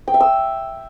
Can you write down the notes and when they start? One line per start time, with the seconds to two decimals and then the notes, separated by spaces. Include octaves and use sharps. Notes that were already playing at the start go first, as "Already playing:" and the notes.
0.08 G5
0.14 E5
0.20 E6